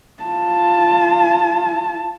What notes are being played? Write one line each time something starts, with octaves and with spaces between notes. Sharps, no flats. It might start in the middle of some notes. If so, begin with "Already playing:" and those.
F4 A5